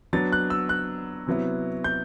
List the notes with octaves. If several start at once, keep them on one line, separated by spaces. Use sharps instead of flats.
F#3 B3 D4 A6
F#6
E6
F#6
C3 F#3 B3 E4
G6